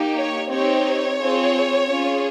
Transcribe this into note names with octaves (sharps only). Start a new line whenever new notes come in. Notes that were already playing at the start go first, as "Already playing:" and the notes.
Already playing: A#3 D#4 G4
C#5
C4 D#4 G4 C#5
C4 F4 G#4
C#4 F4 G#4